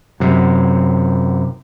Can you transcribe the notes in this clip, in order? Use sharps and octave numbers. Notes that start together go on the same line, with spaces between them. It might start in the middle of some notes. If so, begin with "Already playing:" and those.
F#2 C3